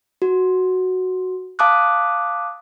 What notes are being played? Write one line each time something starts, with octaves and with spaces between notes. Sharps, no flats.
F#4
F5 A5 D6 D#6 F#6